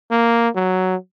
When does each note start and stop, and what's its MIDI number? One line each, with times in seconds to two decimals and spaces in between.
0.11 0.49 58
0.55 0.96 54